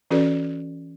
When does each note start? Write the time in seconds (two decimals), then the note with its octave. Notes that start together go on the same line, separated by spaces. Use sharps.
0.11 E3 C#4 F#4 A4 B4 D5